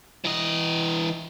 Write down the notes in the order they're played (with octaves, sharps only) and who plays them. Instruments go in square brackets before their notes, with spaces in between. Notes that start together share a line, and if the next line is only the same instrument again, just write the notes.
[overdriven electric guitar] E3 D#5